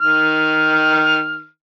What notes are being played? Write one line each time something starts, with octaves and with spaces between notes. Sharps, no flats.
D#3 F6